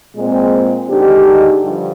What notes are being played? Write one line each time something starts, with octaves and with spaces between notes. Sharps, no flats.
A#2 G#3 C4
D3 G#3 D#4 G4
G2 D3 F3